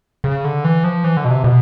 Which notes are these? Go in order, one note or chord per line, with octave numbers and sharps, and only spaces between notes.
C#3
D3
E3
F3
E3
D3
B2
C3
B2